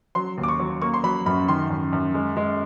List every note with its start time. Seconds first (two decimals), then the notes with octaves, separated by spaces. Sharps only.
0.15 F#3 C6
0.38 D#2
0.43 D6
0.48 C#6
0.60 F#3
0.82 A#3 C#6
0.94 C6
1.04 F#3 B5
1.26 F#2 B5
1.48 D#3 C6
1.70 F#2
1.93 F#2
2.14 G#3
2.37 G#3